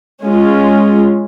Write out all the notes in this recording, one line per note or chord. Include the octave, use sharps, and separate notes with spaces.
G#3 C#4 F4